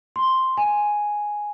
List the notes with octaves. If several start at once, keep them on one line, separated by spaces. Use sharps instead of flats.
C6
G#5